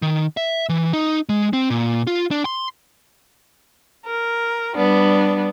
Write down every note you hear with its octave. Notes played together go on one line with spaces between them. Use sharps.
D#3
E5
E3
D#4
G#3
C4
A#2
F4
D4
C6
A#4
G3 B3 D4